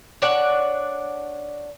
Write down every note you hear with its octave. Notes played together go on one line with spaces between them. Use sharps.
D4 C#5 D5 F#5